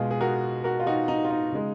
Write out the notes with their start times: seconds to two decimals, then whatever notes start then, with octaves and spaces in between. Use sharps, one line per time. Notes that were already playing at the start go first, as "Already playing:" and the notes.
Already playing: B2 G#3 F4 G#4
0.11 G#4
0.21 F#4 A#4
0.64 F#4 A#4
0.80 F4
0.86 D#4 F#4
1.08 D#4
1.24 F4
1.31 D#4
1.52 C#3 G#3